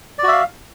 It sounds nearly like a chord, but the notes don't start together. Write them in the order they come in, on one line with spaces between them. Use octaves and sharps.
D5 F#4 E5 F5